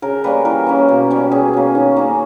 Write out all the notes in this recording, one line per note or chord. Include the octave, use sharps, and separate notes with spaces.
C#3 A#4
G3 A#3 C#4 B4
E3 A#4
A#3 C#4
B2
G3 C#4
B2 G#4
A#3 C#4
D#3
A#3 C#4